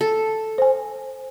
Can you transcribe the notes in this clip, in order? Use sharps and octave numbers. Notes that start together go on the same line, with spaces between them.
A4
C5 G#5